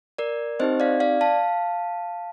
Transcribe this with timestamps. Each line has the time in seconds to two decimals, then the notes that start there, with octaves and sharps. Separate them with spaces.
0.18 A#4 D5
0.60 C4 D#4 G4 C5 D#5
0.80 D5 F5
1.00 D5 F5
1.21 F5 A5